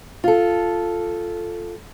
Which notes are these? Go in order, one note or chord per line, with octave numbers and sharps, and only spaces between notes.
F4 A4